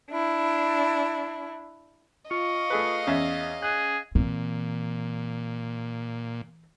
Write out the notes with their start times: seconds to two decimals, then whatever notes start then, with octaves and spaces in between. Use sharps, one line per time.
0.10 D4 E4
2.31 F4 D#5 F5 C#6
2.70 A3 G#4 B4
3.07 E2 C#4 E5
3.62 G#4 F#6
4.15 A#2 E3 C4